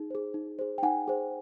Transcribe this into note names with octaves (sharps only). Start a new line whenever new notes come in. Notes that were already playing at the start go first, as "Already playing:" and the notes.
Already playing: D#4 G#4
G#4 C5
D#4
G#4 C5
G5
D#4 F#5 G#5
G#4 C5